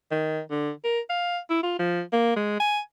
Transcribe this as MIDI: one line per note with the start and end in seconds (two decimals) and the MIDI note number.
0.11 0.41 51
0.51 0.71 50
0.84 1.00 70
1.09 1.38 77
1.50 1.61 64
1.63 1.77 65
1.79 2.01 53
2.13 2.35 58
2.36 2.60 56
2.60 2.79 80